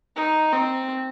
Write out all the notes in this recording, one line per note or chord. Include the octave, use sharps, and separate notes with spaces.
D#4
C4